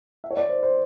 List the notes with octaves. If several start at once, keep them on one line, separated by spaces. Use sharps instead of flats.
E5
C#5
D5
C5
C5